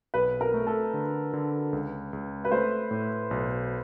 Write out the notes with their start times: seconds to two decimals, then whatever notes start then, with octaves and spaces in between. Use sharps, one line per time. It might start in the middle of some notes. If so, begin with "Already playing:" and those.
0.14 B1 B4
0.41 A#4
0.54 A3
0.67 A4
0.94 D3
1.33 D3
1.73 C#2
2.13 C#2
2.45 B4
2.51 A3 C5
2.91 A2
3.31 B1